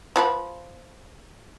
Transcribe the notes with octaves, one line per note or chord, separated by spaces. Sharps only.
F3 F4 B4